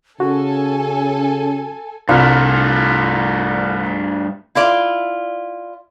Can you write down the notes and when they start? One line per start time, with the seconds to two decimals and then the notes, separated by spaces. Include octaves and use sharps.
0.20 C#3 C#4 F#4 A4 G#5
2.09 C2 G2 A3 F4
4.55 E4 F4 D5